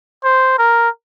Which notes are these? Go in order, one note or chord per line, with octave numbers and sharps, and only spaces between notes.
C5
A#4